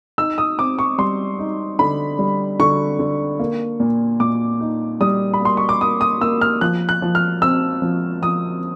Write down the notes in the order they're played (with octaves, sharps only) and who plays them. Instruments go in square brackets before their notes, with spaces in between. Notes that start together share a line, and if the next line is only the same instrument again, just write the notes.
[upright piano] D#4 E6
D#6
C4 D6
C#6
G3 C6
D#4
D3 B5
G3
D3 C#6
D3
A#3
A#2
A#2 D6
D#4
G3 D#6
B5
A#3 C6
C#6
D6
A#3 D#6
D#6
A#3 E6
F6
F3 F#6
F#6
F3
F6
C4 E6
F3
F3 D#6